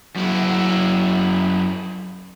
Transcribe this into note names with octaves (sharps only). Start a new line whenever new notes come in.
F#2 E4